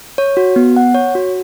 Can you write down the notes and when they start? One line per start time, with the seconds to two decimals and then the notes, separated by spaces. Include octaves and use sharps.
0.18 C#5
0.37 F#4
0.56 B3
0.76 F#5
0.95 C#5
1.15 F#4